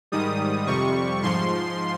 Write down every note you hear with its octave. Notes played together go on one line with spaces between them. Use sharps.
G#2 D#3 G3 D#6
F2 C3 G3 C#6
G#2 F3 C6